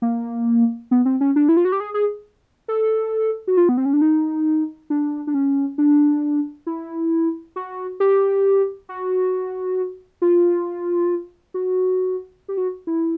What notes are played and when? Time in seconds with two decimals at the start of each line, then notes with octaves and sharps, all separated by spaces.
0.02 A#3
0.91 B3
1.05 C4
1.21 C#4
1.36 D4
1.49 E4
1.57 F4
1.65 F#4
1.72 G4
1.80 G#4
1.94 G#4
2.68 A4
3.47 F#4
3.57 F4
3.69 B3
3.77 C4
3.85 C#4
3.93 D4
4.02 D#4
4.90 D4
5.27 D4
5.34 C#4
5.78 D4
6.67 E4
7.56 F#4
8.00 G4
8.89 F#4
10.22 F4
11.54 F#4
12.48 G4
12.57 F#4
12.87 E4